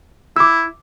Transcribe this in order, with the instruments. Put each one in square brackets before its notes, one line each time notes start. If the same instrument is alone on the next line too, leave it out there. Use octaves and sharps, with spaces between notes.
[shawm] E4 [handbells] D6 E6